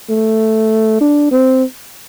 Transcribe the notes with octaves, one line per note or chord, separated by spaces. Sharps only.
A3
D4
C4